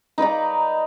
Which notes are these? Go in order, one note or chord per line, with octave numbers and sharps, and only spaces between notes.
D#4 B4 D5 A#5